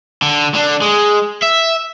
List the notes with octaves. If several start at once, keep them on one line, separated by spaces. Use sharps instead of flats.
D3
D3 D4
G#3
E5